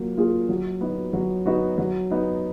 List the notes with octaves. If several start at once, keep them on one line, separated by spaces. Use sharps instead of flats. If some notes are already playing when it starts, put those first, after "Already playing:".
Already playing: F#3 A#3 F4
A#3 F4 G#4
F#3
B3 D#4 F#4
F#3
B3 D#4 F#4
F#3
B3 D#4